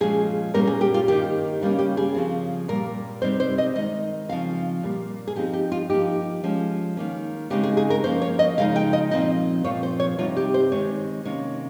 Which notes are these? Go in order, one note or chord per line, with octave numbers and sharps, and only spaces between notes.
A#2 F3 G#3 C#4 G#4
A#2 G3 A#3 C#4 A#4
G#4
G4
F4
D#3 A#3 D#4 G4
C#3 G3 A#3 C#4
G4
G#4
C#3 F3 C4
A#2 G3 A#3 A#4
C3 G3 C4 D#4 C5
C5
D#5
D#3 G#3 D#4 D#5
C#3 F3 C4 D#4 F5
A#2 G3 A#3
G#4
F3 C4 D#4 G4
G4
F4
F3 A#3 D#4 G4
F3 G#3 C#4
D#3 A#3 C#4
C#3 G#3 C4 D#4 G4
G#4
G#4
A#4
F3 A#3 C#4 C5
C#5
D#5
C#3 F3 G#3 D#4 F5
G5
D#5
A#2 F3 C4 D#4 D#5
A#2 F3 C4 C#5
C5
C#5
C3 G3 C4 D#4 F4
G4
C5
D#3 G#3 C4 C#5
C3 D#3 A#3 C#4 C#5